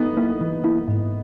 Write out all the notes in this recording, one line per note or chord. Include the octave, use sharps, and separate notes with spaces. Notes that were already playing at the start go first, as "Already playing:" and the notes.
Already playing: B3 D#4
A#3 E4
E3
A#3 E4
G#2